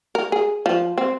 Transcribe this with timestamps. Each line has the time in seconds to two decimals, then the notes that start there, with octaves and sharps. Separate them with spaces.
0.15 A#4
0.32 G#4
0.66 F3
0.98 C4